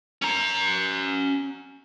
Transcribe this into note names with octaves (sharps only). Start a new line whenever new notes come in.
C#4 A#5